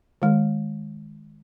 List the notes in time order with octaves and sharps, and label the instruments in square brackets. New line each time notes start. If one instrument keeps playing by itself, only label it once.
[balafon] D#3 G#3